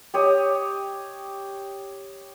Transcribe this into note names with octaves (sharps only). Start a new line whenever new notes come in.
G4 C#5 D#5